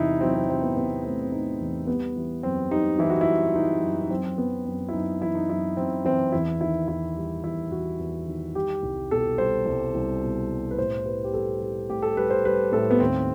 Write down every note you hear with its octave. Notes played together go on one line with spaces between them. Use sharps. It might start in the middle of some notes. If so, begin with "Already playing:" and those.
Already playing: E2 C3 D#4 E4
F#3 C4
C4
F#3 C4
B3
C3 B3
A3 C4
C4
A3 D#4
E2
G3 B3
E3
F#2 C4
G3 D#4
E3 E4
F#4
E4
G3
E3 D#4
F#2
D#4
F#2 C4
F#2 B3
F#2 C4
E4
F#2 D#4
E3 E4
D#4
F#2 E4
F#2 C4
E3 C4
E2 E4
D#3 E4
E2 E4
G3
E2 E4
E2 F#4
E2
D#3
G3 G4
C2
B2 A4
G3 C5
C2
C2
B2
G3
B4
A2 C5
G3 B4
G4
G3 A4
G3
A2 G4
A4
G3 B4
C5
G3 B4
A2 A4
B3
D#2 C4